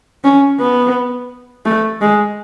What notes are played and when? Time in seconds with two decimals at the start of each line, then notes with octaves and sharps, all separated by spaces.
0.24 C#4
0.60 B3
1.65 A3
2.01 G#3